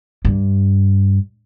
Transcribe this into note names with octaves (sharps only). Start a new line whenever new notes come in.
G2